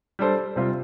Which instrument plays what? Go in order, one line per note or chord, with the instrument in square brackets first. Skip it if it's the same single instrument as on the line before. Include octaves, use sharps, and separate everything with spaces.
[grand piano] G3 D4 A4 C5
C3 G3 C4 F4